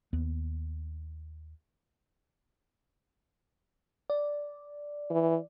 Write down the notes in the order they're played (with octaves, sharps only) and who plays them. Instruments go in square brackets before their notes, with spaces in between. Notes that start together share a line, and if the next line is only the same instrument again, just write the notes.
[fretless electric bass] D#2 B3
[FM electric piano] D5
[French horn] E3